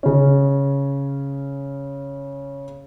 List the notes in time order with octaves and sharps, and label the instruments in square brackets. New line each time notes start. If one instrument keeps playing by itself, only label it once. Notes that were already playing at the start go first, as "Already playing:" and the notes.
[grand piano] C#3 C#4